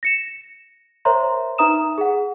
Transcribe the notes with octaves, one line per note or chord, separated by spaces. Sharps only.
A#6 C#7 E7
A#4 C5 C#5 E5 A#5 C6
D#4 B4 E5 A#5 D#6 E7
G#4 F#5